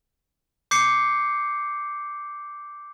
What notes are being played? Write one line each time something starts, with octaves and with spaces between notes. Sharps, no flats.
D6 G6 C7 C#7